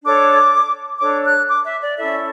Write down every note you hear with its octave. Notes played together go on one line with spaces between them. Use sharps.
D4 A4 C#5 D6
D4 A4 C#5 D6
F#6
D6
E5
D5
C#4 E4 A4 E5